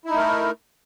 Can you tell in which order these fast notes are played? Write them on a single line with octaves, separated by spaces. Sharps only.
E4 D#4 A3 A#4